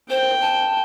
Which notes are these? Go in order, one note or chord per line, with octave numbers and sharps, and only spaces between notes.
C5 G5
A5